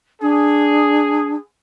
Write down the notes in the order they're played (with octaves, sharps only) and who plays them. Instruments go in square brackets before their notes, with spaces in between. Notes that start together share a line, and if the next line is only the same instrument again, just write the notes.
[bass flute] D4 [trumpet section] G#4